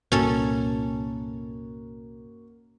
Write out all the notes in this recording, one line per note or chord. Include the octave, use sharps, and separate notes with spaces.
C2 G2 A#2 A#3 C#4 F#4 A4